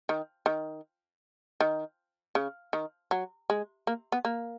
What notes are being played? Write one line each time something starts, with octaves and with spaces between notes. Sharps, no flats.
D#3
D#3
D#3
C#3
D#3
F#3
G#3
A#3
B3
A#3